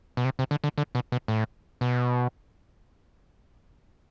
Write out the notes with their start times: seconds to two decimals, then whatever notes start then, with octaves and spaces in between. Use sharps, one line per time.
0.17 B2
0.25 C3
0.39 C3
0.51 D3
0.64 D3
0.78 D3
0.95 B2
1.12 B2
1.28 A2
1.81 B2